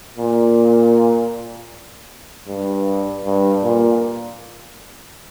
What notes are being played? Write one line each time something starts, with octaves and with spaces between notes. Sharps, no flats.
A#2
G2
G2
A#2